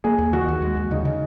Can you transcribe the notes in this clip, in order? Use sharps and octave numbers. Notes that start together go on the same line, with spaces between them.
A#3 G#4
D#2
D#3 F#4
D#2
G#3
D#2
C#3 D#4
C#3